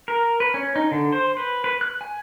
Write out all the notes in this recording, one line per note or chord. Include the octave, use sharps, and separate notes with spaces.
A#4
B4
C#4
D#4
D3
C5
B4
B4
F#6
G#5